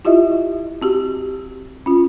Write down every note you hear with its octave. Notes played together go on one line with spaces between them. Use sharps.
E4 F4 G4 D#5 E5
C4 F#4 G4
C#4 F4